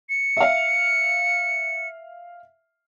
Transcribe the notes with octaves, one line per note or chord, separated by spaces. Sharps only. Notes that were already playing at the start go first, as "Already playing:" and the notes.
C#7
E5 F5